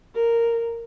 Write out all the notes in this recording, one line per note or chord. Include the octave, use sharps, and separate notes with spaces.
A#4